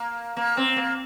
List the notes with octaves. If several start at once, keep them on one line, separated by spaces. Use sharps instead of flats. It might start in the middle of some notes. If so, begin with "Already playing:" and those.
Already playing: A#3
A#3
C4
A#3